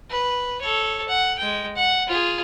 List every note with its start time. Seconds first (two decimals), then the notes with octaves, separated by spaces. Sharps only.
0.10 B4
0.62 A4 C#5
1.08 F#5
1.39 G#3 G5
1.76 F#5
2.08 F4 G#4